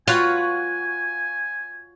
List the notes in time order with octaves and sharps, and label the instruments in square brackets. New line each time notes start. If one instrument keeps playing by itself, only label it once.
[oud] F4 [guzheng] F#4 B4 C#5 [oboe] G#5